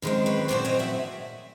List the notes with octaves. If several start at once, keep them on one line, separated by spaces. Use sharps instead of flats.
F#2 D#3 G#3 C4
B4 C#5
A#2 F#3 A3 C4 C5 D5
C#5 D#5
E5 F#5